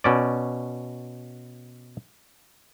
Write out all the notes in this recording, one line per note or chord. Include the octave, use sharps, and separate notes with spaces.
B2 C#4 D5